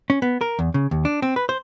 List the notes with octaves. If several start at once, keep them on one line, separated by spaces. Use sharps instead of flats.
C#4
B3
A#4
E2
C#3
D#2
D4
C4
B4
C5